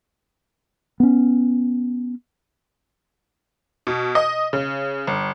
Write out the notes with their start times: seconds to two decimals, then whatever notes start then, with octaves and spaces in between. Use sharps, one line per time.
1.00 B3 C#4
3.87 B2
4.15 D#5
4.53 C#3
5.07 G1